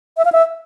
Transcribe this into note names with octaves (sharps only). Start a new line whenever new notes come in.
E5
F5
E5